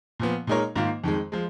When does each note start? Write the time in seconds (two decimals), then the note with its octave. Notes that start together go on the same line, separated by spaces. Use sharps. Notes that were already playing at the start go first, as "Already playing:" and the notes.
0.20 A#2 F3 B3
0.47 A#2 G#3 D#4 A#4 C#5
0.76 G#2 D#3 A#3 F4
1.04 F2 D#3 G#3
1.32 F3 G#3